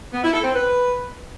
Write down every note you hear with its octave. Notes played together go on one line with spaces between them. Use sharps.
B3
E4
A4
C4
B4